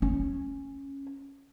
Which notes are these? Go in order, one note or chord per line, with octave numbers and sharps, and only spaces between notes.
C#4